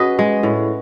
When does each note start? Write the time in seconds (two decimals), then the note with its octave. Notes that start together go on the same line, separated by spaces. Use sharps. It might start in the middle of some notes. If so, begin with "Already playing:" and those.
Already playing: C#4 F#4 G#4 B4 D#5
0.19 G#3
0.43 A2